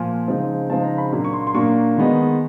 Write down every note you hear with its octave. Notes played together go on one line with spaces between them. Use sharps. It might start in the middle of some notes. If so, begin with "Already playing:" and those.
Already playing: A#2 F3 G#5
C#3 F3 G#3 C4 D#4
C#3 F3 G#3 C4 D#4 A5
A#5
B5
A#2 F#3 A#3 D4
C#6
C6
C6
A#2 F#3 A#3 D4 C#6
D#3 G#3 B3 D#4